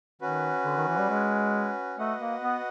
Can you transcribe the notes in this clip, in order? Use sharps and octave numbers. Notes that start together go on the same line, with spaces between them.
D#3 C#4 F#4 B4
D3
D#3
E3
G3
G#3
A3 F#4 B4 D#5 F#5
A#3
B3